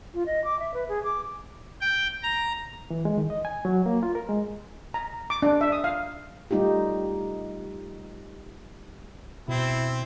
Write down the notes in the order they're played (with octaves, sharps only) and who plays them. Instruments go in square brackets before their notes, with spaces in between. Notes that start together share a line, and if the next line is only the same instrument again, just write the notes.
[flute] F4
D#5
D6
E5
B4
G#4
D6
[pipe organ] G5
A#5
[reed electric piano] E3
G#3
D#3
D#5
G#5
F#3
A#3
F4
A#4
G#3
[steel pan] A#5
D6
D4
E5
D#6
F5
[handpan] G3 A3 D#4 F4 G4
[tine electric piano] B2 [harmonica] C4 [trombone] E4